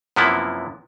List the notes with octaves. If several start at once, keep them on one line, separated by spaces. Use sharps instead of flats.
F#2 C3 F3 A#3 B3 E4